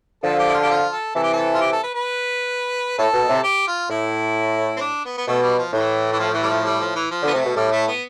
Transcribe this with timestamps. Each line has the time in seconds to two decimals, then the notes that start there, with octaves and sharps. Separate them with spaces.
0.23 D3 F3 A4
0.39 G4
0.49 E4
0.54 F4
0.62 G4
0.69 F4
0.92 A4
1.15 C3 E3 A4
1.23 G4
1.33 A4
1.55 F4
1.61 G4
1.72 A4
1.83 B4
1.94 B4
2.97 A2 A4
3.13 B2
3.28 A2 C3
3.44 G4
3.67 F4
3.90 A2 E4
4.77 C4
4.81 D4
5.05 B3
5.17 B3
5.27 B2 A3
5.42 G3
5.58 F3
5.73 A2 E3
6.12 E3
6.19 F3
6.34 E3
6.42 G3
6.50 F3
6.64 G3
6.80 F3
6.95 E3
7.11 F3
7.23 D3 B3
7.33 C3 A3
7.45 B2
7.56 A2 G3
7.71 A3
7.87 B3